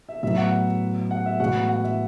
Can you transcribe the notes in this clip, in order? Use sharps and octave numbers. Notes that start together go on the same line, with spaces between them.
E5
A2 F#3 B3 E5
F#5
F#5
E5
A2 E3 G#3 B3 F#4 F#5
F#5
E5